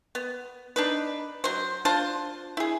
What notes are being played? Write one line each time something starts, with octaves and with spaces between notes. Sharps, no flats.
B3
D4 D#4 B4
F#3 C5
D4 F4 C5 A5
E4 G#4